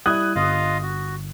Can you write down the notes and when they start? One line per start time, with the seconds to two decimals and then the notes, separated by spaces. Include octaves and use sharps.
0.06 G3 E4 D#6 F#6 G#6
0.36 G1 F4 D#5 F5
0.82 F#4